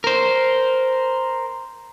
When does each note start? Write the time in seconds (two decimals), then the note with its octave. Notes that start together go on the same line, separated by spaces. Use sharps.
0.04 A#4 C5